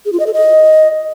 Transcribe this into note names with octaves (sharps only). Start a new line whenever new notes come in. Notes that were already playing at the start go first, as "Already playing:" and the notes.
G#4
F4
D#5
A4
D#5